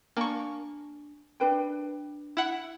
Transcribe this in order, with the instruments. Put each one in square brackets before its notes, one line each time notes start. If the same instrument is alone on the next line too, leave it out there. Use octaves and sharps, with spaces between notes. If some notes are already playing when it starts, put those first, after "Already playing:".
[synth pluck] A#3 C#6 [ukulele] D4 G#5 A5
[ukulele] D4 B4 G5
[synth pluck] E4 F#5